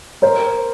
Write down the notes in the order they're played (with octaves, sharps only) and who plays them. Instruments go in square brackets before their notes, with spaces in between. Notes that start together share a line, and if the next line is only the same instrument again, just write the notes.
[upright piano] A#4 C5